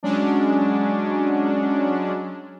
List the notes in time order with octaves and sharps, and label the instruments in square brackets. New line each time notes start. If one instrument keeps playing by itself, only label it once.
[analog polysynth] F#3 G#3 C#4 D4